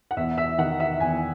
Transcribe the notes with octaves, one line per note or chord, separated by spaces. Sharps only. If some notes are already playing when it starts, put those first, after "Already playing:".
F#5
E2 E5
E5
D#3 F#5
E5
E2 G#5